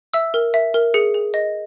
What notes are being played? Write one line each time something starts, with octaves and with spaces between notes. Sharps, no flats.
E5 E6
A#4
E5
A#4
G#4 C#7
G#4
D#5